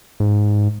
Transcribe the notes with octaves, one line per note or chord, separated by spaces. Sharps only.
G#2